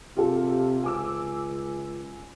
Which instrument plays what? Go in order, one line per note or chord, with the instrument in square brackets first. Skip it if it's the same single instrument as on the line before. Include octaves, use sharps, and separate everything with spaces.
[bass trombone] C3 [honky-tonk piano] F4 G4 A4
[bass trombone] C#2 [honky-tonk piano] G#5 D6 E6